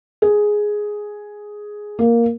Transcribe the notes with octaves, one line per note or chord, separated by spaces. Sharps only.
G#4
A#3